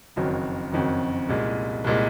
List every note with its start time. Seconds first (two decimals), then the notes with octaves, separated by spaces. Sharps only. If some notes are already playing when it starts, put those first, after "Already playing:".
0.16 F#1 F2 D#3 F#3
0.72 F#1 F2 D#3 F#3
1.29 C2 A#2 G#3
1.84 C2 A#2 G#3